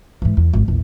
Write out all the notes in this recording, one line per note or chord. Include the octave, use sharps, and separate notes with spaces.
G#2 E3
E2
G#1
A#1 E2